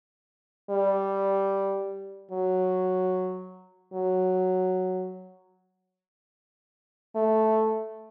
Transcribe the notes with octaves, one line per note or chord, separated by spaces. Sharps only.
G3
F#3
F#3
A3